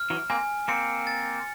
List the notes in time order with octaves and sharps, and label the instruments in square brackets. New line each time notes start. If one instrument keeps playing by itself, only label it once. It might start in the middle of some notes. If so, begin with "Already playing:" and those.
Already playing: [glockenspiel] F6
[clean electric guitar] E3 F#3
[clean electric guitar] A#3 C4 [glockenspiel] G#5
[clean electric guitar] A#3 C4 [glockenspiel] C#7
[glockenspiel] A6